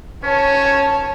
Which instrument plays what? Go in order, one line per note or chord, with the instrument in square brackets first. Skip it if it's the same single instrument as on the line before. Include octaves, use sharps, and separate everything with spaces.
[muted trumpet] C#4 [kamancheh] C#5 A5